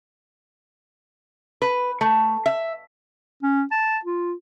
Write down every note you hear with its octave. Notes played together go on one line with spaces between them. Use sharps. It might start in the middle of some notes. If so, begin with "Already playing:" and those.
B4
A3
E5
C#4
A5
F4